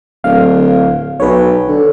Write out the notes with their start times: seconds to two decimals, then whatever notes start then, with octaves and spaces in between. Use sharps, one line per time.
0.24 D1 F5
1.20 B1 B4 C#5
1.68 D3